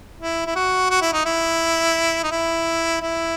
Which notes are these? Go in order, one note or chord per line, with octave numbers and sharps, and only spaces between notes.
E4
E4
F#4
F#4
E4
D#4
E4
D#4
E4
E4